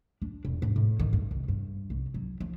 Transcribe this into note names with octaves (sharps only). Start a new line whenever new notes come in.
D4
E1
G#2
A2
D#3
G2
C2
G2
C2
F#3
F3